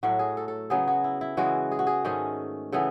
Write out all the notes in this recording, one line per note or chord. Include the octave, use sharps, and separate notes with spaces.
A2 F#3 A3 F#4
G#4
A4
A4
C#3 F#3 B3 G#4
F#4
E4
E4
C#3 E3 G#3 B3 F#4
G#4
F#4
G#4
G#2 D#3 A3 C#4 G#4
C#3 E3 B3 A4